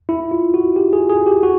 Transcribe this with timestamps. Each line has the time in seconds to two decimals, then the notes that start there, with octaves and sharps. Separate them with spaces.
0.09 E4
0.31 F4
0.54 F#4
0.76 G4
0.93 G#4
1.10 G#4
1.27 G4
1.43 F#4